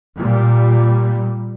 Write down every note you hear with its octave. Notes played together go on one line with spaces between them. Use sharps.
A#2 G3